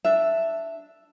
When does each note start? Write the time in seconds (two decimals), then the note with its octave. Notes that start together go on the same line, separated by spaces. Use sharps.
0.05 D4 E5